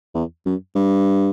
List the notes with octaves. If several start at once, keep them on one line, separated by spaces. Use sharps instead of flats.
E2
F#2
G2